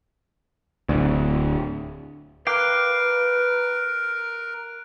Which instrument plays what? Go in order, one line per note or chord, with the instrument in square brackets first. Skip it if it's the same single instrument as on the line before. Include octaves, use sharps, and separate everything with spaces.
[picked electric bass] D1 D2
[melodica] A#4 [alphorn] B4 [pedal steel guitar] F5 G5 D6 [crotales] F#6 D7